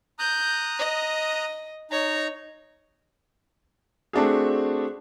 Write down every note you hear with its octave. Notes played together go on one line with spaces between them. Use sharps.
A#5 D#6 F#6 G6
D#5
D#4 C#5 A#5
A3 C4 D4 F#4 G#4